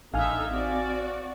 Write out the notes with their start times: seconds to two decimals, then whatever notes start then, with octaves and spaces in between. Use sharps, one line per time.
0.14 A1 D3 D#4 E5 F5 G#5 F6
0.48 C4 F#4 D5